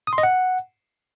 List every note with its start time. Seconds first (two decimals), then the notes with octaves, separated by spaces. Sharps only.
0.07 D#6
0.13 C6
0.18 D#5
0.23 F#5